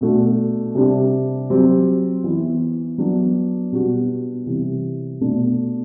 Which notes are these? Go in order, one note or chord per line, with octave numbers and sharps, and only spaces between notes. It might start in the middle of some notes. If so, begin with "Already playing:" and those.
B2 A3 D4 F#4
C3 G3 D4
F#3 C4 G4
E3 B3 E4
F#3 B3 D4 F#4
B2 G3 B3 D4 F#4
C3 E3 G3
B2 A3 D4